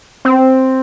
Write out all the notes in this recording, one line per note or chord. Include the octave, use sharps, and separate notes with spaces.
C4